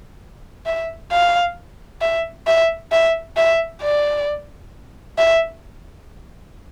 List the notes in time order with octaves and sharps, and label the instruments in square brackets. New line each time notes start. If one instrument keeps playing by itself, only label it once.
[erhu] E5
F5
E5
E5
E5
E5
D5
E5